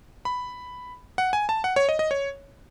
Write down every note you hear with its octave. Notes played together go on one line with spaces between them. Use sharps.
B5
F#5
G#5
A5
F#5
C#5
D#5
D#5
C#5